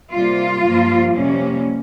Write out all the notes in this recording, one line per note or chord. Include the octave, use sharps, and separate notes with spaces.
C3 G3 A#3 F4
G2 F3 A#3
F2 C3 G3 A#3 C#4